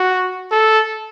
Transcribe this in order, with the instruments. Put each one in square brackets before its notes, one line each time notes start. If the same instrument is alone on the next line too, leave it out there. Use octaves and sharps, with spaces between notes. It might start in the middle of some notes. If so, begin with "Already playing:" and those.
Already playing: [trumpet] F#4
A4